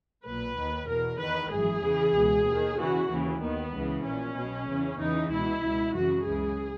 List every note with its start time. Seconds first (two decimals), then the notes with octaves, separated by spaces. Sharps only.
0.25 B1 A#2 B4
0.56 D#2 D#3
0.88 E2 B2 A#4
1.19 E2 D#3 B4
1.51 G#1 F#2 E3 G#4
1.83 E2 C#3 E3
2.14 C#2 B2
2.46 D#2
2.51 D#3
2.77 E2 C#3 E3 F#4
3.09 D#2 C#3 E3
3.41 D#2 D#3 B3
3.73 C#2 C#3 E3
4.04 A#1 A#2 C#4
4.36 B1 B2
4.68 E2 C#3 E3
4.99 E2 C#3 E3 D#4
5.30 C#2 B2 E4
5.63 C#2 B2
5.94 G#1 F#2 C#3 E3 F#4
6.25 C#2 C#3 E3 G#4